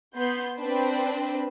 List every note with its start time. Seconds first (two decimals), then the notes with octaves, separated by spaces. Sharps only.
0.15 B3 C6 G6
0.57 C4 D4 B4 C5